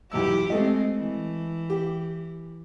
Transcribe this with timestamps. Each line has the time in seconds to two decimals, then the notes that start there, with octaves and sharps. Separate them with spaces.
0.11 B1 E2 E4 G4 E6
0.50 G#3 A3 C4 D#5
0.97 E3
1.70 G4